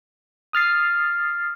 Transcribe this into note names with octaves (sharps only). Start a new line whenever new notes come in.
D#6 F6 A6 C7